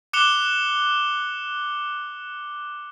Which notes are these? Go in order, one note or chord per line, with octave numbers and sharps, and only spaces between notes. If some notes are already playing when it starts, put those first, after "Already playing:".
D6 F#6 C#7 E7 F7 G7